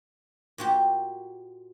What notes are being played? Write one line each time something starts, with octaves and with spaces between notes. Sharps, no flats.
A#2 F#4 G4